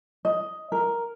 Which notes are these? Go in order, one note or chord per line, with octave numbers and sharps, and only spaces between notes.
D#5
A#4